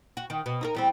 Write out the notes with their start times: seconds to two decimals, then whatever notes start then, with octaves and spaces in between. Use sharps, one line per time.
0.17 F#4
0.30 D#3
0.46 B2
0.61 D#4 F#4 A#4
0.75 E2 G3 C4